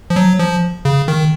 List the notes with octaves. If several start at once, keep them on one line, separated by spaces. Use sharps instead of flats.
F3
F#3
F3
C#3
D#3